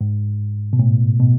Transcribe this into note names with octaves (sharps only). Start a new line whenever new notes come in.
G#2
B2
A2
B2